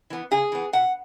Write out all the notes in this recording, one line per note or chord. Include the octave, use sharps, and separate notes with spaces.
E3 B3
C#3 G#4
E3 B3
B2 F#5